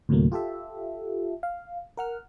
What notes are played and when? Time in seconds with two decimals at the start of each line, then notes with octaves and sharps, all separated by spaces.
0.09 D2 A2 C3 F#3 A3 A#3
0.32 F4 G4 A4 E5
1.43 F5
1.97 A#4 F#5 F6